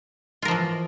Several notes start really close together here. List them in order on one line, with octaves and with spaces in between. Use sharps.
F4 A#4 F3 E3